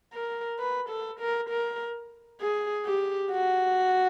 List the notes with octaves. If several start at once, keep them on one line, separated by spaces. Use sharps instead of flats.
A#4
B4
A4
A#4
A#4
G#4
G4
F#4